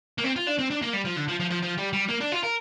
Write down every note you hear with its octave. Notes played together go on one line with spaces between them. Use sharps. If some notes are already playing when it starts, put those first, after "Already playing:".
A#3
C4
F4
D4
C4
D4
A#3
G3
F3
D3
F3
F3
F3
F3
G3
G3
A#3
D4
F4
A#4